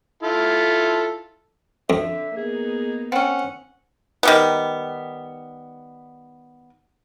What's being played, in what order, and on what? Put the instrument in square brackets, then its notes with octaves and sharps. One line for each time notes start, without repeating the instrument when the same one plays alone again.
[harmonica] E4 F4 A4
[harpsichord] F2 [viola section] D3 [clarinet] E5
[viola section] A#3 B3 D#4 [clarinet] G#4
[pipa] C4 C#4 [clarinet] F#5
[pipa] D#3 G3 B3